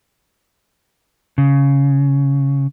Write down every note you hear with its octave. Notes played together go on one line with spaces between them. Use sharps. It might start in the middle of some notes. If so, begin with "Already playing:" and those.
C#3